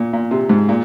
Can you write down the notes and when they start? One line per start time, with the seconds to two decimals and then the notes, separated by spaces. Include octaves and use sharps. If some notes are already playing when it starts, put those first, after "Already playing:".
Already playing: A#2
0.13 A#2
0.31 C3
0.49 G#2
0.69 A#2